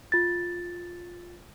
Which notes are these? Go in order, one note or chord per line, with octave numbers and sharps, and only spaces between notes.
F4 A6